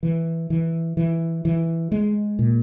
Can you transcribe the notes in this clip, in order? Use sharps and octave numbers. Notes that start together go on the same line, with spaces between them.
E3
E3
E3
E3
G#3
A#2